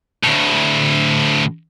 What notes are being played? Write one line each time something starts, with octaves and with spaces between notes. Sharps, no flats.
D2 A2